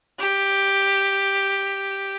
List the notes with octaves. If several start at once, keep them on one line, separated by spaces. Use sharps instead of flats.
G4